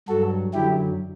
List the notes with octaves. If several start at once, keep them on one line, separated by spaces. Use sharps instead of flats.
G2 F#3 F#4 A4
F#2 D3 F#3 E4 G4